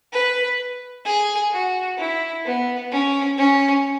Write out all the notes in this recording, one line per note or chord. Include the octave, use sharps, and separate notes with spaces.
B4
G#4
F#4
E4
B3
C#4
C#4